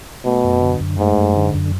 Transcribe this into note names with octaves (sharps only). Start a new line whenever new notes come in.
B2 A3
F#2
D3
F#2
G#2 A3
F#2
D3
F#2